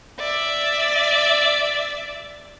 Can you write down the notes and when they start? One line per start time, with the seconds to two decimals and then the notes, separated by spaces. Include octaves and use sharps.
0.19 D5 E5